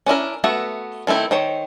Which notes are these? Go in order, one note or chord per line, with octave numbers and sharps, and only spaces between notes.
C#4 D4 E4 A#4
A3 B3 F#4 E5 F#5
D#3 A3 C4 E4
D#3 C5 C#5